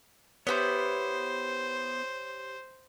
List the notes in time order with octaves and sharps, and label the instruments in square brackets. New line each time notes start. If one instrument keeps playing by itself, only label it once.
[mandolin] B3 E4 G6 [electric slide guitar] G4 C#5 [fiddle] C5